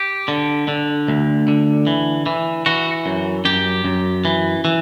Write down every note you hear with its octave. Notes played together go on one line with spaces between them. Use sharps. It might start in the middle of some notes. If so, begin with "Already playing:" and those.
Already playing: G4
D3
D3
D2
D3
E3
E3
E3 F#4
F#2
F#2 G4
F#2
E3
E3